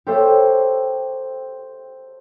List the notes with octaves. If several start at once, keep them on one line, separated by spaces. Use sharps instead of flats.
G4 A4 C5 C#5 E5 G5